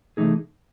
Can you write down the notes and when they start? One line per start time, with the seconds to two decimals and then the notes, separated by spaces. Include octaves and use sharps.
0.17 C3 E3 A3 D#4 G#4